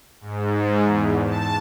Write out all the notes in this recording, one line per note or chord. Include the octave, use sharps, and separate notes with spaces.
G#2
E2
A5